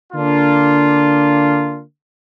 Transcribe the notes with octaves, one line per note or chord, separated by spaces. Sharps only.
D3 A#3 D4 F4